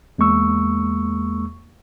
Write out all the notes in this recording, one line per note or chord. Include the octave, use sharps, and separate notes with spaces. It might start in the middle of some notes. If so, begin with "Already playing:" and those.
E2 G#3 A#3 C#6 E6